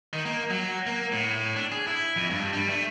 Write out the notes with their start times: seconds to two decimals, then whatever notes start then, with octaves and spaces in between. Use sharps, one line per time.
0.13 D#3
0.25 A#3
0.50 F#3
0.87 A#3
1.12 A2
1.56 D4
1.72 G#4
1.87 E4
2.16 F2
2.30 G2
2.53 G3
2.69 A3